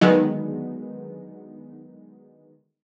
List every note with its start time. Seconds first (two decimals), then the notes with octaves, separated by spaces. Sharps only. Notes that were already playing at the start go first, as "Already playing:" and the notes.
0.01 D3 D#3 F#3 G#3 B3 D#4